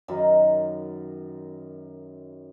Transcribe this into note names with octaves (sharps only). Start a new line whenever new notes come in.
F#2 D#3 D#4